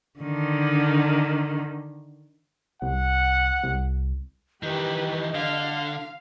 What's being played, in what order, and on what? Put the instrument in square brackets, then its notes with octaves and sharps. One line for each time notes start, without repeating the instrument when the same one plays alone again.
[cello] D3 D#3
[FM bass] C2 [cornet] F#5
[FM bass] C2
[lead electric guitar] D#3 E3 [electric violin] G4 B4 [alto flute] D#5
[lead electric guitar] D3 [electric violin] F5